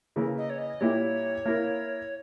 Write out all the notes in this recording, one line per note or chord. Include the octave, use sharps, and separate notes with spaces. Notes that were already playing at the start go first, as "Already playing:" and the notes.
C#3 E3 A#3
D#5
C#5
D#5
A#2 G3 A#3 E4 G4 C#5
A#3 E4 A#4